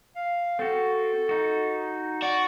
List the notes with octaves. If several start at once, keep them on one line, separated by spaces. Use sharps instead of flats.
F5
C4 F#4 A4
D#4 F#4
F#4 D5